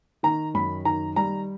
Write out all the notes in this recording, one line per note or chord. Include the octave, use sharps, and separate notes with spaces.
D#3 A#5
F#2 B5
D#3 A#5
G3 A#5